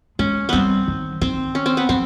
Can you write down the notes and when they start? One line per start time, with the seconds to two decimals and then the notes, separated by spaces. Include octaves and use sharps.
0.19 G#3 C#4
0.49 G3 B3 C4
0.88 D#3
1.21 D#3 C4
1.55 C#4
1.66 C4
1.77 B3
1.89 F3 C4